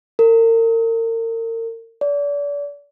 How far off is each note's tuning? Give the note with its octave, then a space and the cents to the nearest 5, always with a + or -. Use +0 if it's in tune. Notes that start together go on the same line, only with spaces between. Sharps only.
A#4 -40
D5 -35